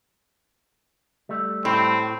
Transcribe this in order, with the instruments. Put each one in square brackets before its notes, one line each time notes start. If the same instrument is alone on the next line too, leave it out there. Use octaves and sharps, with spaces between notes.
[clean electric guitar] G3 A3
[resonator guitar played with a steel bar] A2 [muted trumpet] C4